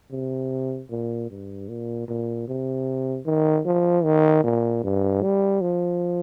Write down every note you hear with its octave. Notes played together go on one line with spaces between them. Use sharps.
C3
A#2
G2
A#2
A#2
C3
D#3
F3
D#3
A#2
G2
G3
F3